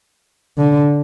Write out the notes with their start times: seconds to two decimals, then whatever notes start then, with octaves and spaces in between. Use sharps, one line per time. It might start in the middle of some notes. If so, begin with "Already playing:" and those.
0.58 D3